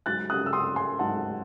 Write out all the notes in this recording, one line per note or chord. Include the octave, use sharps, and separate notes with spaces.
G#2 F#3 F#6 A6
D#6 F#6
E6
C6 D#6
G#5 C6
G#2 F#3 F#5 A5